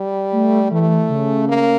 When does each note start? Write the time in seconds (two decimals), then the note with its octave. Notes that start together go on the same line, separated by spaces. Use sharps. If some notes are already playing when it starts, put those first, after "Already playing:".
Already playing: G3
0.32 A3
0.71 E3 A3
1.09 C#3
1.48 A#3